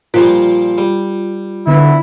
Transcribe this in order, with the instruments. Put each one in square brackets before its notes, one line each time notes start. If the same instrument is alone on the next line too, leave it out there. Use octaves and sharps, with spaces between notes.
[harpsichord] A#2 F3 G3 [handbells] F4
[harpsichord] G3
[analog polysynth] D3 B3 [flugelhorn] E4